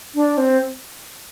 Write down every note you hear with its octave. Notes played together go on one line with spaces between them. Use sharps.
D4
C4